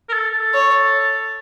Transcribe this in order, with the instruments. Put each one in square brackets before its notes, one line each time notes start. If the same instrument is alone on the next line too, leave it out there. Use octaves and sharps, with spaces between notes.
[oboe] A#4
A4
A4
[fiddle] C#5